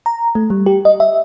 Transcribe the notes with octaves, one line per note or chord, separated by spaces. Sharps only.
A#5
A3
G3
G4
D#5
E5